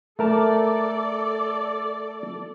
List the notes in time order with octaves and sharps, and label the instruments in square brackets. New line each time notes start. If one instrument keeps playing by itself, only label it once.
[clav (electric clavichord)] A3 A#4 A5 [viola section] A4 D5